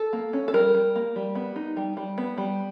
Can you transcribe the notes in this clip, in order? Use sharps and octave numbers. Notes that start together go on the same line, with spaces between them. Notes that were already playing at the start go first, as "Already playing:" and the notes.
Already playing: A4
A#3
C#4
A4
G3 A#4
G3
A#3
G3
B3
D#4
G3
G3
B3
G3